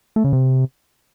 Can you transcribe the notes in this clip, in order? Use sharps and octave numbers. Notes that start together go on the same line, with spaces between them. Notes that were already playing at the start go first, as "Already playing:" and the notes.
A3
C#3
C3